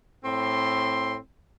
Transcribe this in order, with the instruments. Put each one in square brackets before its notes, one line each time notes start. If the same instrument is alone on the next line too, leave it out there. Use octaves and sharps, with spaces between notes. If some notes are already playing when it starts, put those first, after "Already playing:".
[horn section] A2 C4 C6